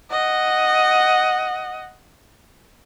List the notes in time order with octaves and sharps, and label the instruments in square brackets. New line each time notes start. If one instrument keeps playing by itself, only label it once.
[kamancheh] D#5 F#5